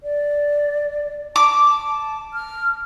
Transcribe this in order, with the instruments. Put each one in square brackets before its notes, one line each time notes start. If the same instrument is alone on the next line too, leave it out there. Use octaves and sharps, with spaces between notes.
[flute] D5
[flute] A5 [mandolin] D6
[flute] A5
F6